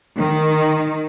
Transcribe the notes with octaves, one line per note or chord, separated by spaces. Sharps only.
D#3